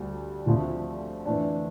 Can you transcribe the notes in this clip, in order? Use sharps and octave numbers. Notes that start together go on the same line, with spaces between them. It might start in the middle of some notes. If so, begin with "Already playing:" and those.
Already playing: D2 G3
D2 D3 F3 A3 C4
F2 E3 A3 D4